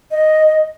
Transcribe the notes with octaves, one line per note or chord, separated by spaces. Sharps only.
D#5